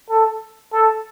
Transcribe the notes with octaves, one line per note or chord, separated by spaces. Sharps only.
A4
A4